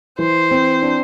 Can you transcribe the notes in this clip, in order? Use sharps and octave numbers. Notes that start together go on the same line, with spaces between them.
E3 C5
C4
D4